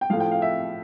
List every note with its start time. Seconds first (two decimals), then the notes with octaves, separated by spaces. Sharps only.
0.01 G5
0.10 F3 F5
0.13 A2
0.20 G5
0.31 F5
0.42 E5